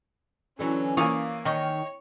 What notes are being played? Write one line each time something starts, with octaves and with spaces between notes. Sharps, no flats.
D3 E3 F#3 C#4
E3 A#3 C#5 D5 F5 G#5 D#6
D#3 C#5 D#5 C#6